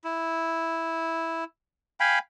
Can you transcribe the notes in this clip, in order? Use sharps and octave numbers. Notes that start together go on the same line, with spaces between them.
E4
F5 G5 G#5 B5